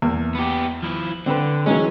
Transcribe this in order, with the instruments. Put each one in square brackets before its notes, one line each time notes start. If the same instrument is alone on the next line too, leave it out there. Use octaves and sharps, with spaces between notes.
[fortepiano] E2 A#3
[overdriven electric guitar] B3 G4
F3 E4
[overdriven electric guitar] D3 [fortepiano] C4 B4
[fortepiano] E3 F#3 G#3 [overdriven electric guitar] C#4